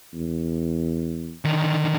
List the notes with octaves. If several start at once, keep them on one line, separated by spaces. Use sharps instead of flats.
E2
D3 D#3